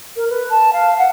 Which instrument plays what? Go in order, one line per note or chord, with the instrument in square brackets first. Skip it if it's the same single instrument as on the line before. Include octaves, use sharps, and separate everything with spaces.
[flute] A#4
B4
A5
F5
F#5